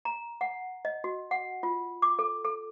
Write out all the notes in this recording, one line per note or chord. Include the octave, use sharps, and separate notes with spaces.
A#5
F#5
D#5
F#4
F#5
F4
D6
A4
A4